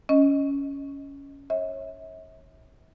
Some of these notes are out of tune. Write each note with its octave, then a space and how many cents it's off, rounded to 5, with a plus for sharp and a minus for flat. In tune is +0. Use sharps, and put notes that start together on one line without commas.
C#4 +10 D#5 +0
C#5 -20 E5 -40